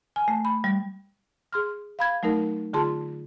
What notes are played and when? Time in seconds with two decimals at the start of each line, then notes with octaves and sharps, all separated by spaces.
0.16 G#5
0.28 A3
0.45 B5
0.64 G3
1.52 G#4 C6 F6
1.99 F5 B5 G#6
2.23 F#3 A3 D#4 A#4
2.73 D3 F4 G#4 A5 C6